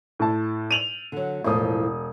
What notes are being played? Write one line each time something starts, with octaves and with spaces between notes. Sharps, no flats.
A2 A5
D#7 F7 F#7
D3 F#3
E1 A2 F3 D#6